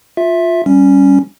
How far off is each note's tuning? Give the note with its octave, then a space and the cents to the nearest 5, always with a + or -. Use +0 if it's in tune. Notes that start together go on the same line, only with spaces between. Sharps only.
F4 +15 E5 +0
G3 +0 C#4 +0